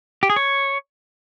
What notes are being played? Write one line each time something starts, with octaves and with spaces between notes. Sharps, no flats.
G4
G#4
C#5